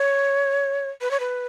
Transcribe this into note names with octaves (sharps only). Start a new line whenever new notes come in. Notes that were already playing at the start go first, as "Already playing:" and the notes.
Already playing: C#5
B4
C#5
B4